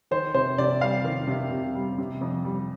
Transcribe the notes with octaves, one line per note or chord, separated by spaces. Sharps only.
D#3 C5
C3 C5
C3 D5
G3 F5
D#3
C3
C3
G3
C3
F2
G3